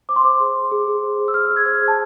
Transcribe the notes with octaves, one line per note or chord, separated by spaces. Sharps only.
C5 D6
C6
C5 D6
G#4
C5
G#4
G#4
C5
G#4
E6
G#4 F6
G#4
G#6
C5 F6
G#4
A5